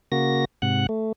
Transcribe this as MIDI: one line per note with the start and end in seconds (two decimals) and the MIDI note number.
0.12 0.45 49
0.12 0.45 58
0.12 0.45 66
0.12 0.45 94
0.62 0.86 44
0.62 0.86 48
0.62 0.86 78
0.62 0.86 90
0.89 1.12 57